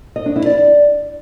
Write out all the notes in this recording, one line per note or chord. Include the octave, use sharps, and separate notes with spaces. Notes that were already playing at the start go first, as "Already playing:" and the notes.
D#5
D4
E4
D5